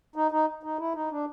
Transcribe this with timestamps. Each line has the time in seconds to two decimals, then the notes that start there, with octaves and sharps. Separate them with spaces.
0.16 D#4
0.31 D#4
0.63 D#4
0.79 E4
0.95 D#4
1.11 D4